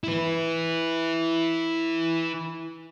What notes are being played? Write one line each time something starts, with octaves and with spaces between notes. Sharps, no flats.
E4 B4